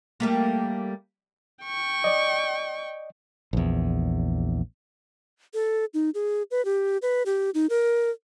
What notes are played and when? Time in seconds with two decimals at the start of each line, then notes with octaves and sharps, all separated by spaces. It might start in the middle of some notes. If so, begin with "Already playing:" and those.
0.20 G3 A3 A#3
1.64 G5 C#6
2.04 D5 D#5
3.53 A#1 E2
5.54 A4
5.94 D#4
6.14 G#4
6.51 B4
6.65 G4
7.02 B4
7.26 G4
7.54 D#4
7.70 A#4